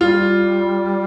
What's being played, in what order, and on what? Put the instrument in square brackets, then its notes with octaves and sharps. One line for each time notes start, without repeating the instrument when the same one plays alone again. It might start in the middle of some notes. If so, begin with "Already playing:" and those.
[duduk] G3 [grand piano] F4